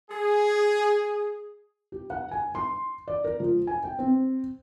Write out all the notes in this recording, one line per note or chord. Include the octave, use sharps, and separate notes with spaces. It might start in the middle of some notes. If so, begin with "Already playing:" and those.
G#4
G4
F#5
G#5
C6
D5
A#4
F3
G#5
G5
C4